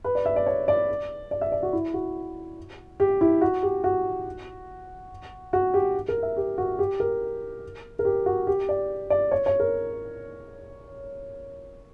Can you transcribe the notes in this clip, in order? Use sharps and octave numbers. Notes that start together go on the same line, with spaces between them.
B4
D5
E5
D5
C#5
D5
D5
E5
D5
F#4
E4
F#4
G4
E4
F#4
G4
F#4
F#4
G4
A#4
E5
G4
F#4
G4
A#4
A#4
G4
F#4
G4
D5
D5
C#5
C#5
A#4